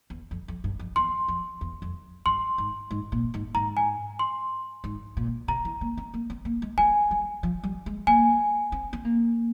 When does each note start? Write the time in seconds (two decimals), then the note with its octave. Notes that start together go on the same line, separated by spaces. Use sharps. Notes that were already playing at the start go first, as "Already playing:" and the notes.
0.10 E2
0.31 F2
0.48 F2
0.64 G2
0.79 F2
0.96 E2 C6
1.28 F2
1.61 E2
1.82 F2
2.26 G2 C6
2.58 G#2
2.91 G#2
3.12 A#2
3.34 G#2
3.55 G#2 A#5
3.77 G#5
4.19 C6
4.84 G#2
5.17 A#2
5.48 C3 A#5
5.65 E3
5.81 A#3
5.97 C4
6.14 A#3
6.30 C4
6.45 A#3
6.62 G#3
6.78 G3 G#5
7.11 G3
7.43 F3
7.63 G3
7.86 G#3
8.07 A#3 G#5
8.72 C4
8.93 C4
9.05 A#3